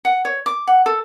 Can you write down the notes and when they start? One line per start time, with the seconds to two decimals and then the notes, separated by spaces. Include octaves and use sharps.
0.05 F#5
0.25 C#5
0.46 D6
0.67 F#5
0.86 A4